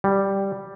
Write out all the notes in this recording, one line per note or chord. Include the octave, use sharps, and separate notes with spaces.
G3